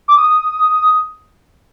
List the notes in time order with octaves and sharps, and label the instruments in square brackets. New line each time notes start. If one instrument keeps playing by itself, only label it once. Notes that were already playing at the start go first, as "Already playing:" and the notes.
[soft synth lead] D6
D#6